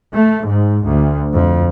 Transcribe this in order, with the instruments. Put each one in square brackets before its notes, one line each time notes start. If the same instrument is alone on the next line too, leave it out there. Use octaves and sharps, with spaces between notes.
[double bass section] A3
G#2
D2
F2